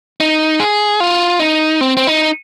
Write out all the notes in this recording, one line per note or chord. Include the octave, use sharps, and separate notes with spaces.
D#4
G#4
F4
D#4
C4
C4
D#4